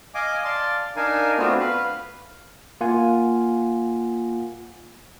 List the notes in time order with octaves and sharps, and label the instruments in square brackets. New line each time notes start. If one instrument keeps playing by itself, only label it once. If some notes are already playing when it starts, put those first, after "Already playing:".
[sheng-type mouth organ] D#5 F5 G#5 D6
D5 F5 A5 C6
D4 D#4 A#4 F5 G#5
A3 B3 C4 D4 F4 F#4
B4 F5
[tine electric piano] A#3 F4 F#5 G#5